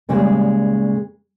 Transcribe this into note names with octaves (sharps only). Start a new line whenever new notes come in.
A#2 C#3 G3 G#3 A#3